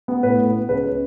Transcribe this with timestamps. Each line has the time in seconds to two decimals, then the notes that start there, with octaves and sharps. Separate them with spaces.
0.08 B3
0.23 A2 B4
0.38 A2
0.53 B3
0.69 C#2 B4
0.84 C#4